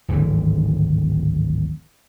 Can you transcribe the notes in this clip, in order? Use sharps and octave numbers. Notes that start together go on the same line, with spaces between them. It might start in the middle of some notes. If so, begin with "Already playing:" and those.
D1 G#1 D3 E3